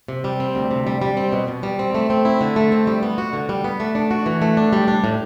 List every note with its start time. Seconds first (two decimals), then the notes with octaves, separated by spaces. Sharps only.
0.08 C3
0.24 G3
0.40 C4
0.55 D2
0.71 C3
0.87 G3
1.02 G3
1.17 C4
1.32 B2
1.48 B2
1.63 G3
1.79 C4
1.94 A3
2.10 C4
2.25 E4
2.41 D3
2.56 A3
2.72 C4
2.87 G3
3.03 B3
3.18 F#4
3.33 D3
3.49 G3
3.64 B3
3.80 A3
3.95 D4
4.11 F#4
4.26 E3
4.42 A3
4.57 D4
4.73 G3
4.88 D4
5.04 A2